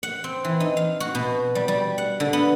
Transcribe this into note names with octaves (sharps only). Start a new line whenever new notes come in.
F#5
C4
E3
D#4
F5
F#4
B2
G3
G3
F#5
D3
B3